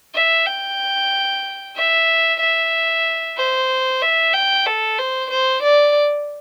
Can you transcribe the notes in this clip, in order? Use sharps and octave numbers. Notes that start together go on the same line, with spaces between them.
E5
G5
E5
E5
C5
E5
G5
A4
C5
C5
D5